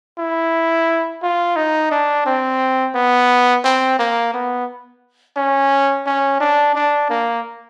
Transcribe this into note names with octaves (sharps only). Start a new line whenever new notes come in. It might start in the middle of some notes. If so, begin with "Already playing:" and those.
E4
F4
D#4
D4
C4
B3
C4
A#3
B3
C#4
C#4
D4
D4
A#3